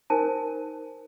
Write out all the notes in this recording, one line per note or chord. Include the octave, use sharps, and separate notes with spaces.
D#4 A#4 C5 G#5 A5